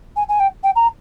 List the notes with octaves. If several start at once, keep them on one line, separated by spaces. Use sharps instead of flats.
G#5
G#5
G5
G5
A#5